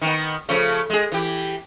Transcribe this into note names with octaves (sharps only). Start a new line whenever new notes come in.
D#3 B3
C#3 F3 A3
G#3 G#4
E3 G4